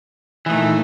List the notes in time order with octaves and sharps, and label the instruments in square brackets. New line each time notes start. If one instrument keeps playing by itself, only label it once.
[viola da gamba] A#2 A3 D#4 [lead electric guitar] E3